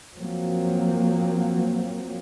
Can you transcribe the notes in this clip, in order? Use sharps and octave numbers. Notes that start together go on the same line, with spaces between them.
F3 F#3 A#3 C4